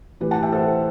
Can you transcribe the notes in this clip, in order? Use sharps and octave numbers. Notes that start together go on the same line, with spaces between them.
A2 E3 G4 B4
F#5 A5
E5 G5
A4 C5